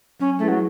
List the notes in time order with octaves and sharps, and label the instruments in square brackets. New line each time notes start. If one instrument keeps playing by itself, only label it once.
[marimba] F#3 [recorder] C#4
[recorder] A3 [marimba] C#4 E4 G#4 B4
[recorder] F#3